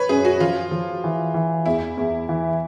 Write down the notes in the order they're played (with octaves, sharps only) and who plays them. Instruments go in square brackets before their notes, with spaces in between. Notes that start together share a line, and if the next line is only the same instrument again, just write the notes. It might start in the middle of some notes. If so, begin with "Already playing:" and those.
Already playing: [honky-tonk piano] B4 C#5
[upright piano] F#2 [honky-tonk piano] G#4
[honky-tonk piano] F#4
[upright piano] F3 [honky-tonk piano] F4
[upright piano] F3
E3
E3
[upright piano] E2 [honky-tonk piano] E4
[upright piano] E2
E3